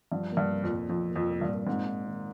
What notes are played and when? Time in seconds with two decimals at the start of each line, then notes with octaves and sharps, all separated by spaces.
0.12 G2 F3
0.31 A#3
0.37 G2
0.51 C2
0.64 F2
0.69 A#2
0.89 F2 F3
1.09 A#3
1.16 F2
1.29 C2
1.41 G2
1.47 A#2
1.67 G#2 C4
1.87 D#4
2.06 D#3